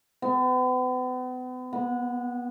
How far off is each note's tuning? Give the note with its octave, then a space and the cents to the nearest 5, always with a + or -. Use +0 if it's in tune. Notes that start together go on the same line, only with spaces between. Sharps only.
B3 +40
B3 -25